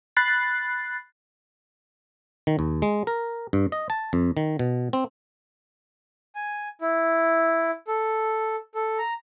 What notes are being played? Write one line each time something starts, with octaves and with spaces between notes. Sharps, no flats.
B5 F#6 A6 C7
D#3
D#2
G#3
A#4
G2
D#5
A5
F2
D#3
B2
C4
G#5
E4
A4
A4
A#5